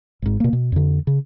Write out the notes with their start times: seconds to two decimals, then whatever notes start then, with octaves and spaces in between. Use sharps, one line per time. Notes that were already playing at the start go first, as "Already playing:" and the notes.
0.22 G#1 G#2
0.40 B2 A#3
0.53 B2
0.72 F2 D3
1.07 C#3